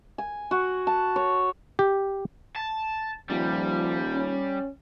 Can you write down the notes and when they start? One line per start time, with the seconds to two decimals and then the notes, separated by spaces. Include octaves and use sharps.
0.18 G#5
0.51 F#4
0.87 A5
1.16 C#5
1.79 G4
2.56 A5
3.30 D#1 F3 G3
4.15 C#4